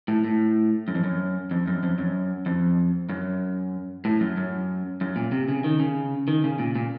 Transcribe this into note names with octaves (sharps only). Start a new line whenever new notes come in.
A2
A2
F#2
F2
F#2
F2
F#2
F2
F#2
F2
F#2
A2
F#2
F#2
F#2
A#2
C3
C#3
D#3
C#3
D#3
C#3
A#2
A#2